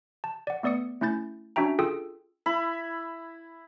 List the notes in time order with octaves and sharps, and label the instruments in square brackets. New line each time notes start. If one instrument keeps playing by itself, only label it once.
[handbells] A5
D5 F#5
A3 B3 D5 D#6 C#7
A3 C#4 E4 G6 A6
C#4 D4 F#4 E5 G5 A#5
F4 G#4 A4 G5 D#6 E6
[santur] E4 B5